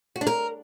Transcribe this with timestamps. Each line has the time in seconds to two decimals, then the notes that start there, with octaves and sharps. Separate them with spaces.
0.16 F#4
0.21 D4
0.27 A#4